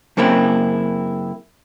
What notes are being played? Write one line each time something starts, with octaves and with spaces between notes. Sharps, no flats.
F#2 C#3 A#3 C4 E4